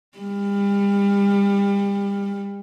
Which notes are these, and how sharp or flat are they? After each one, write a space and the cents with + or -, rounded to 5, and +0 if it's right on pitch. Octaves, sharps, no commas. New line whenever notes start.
G3 +35